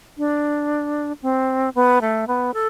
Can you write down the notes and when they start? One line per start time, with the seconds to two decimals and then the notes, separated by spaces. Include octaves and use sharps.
0.18 D4
1.22 C4
1.75 B3
2.01 A3
2.27 B3
2.54 A4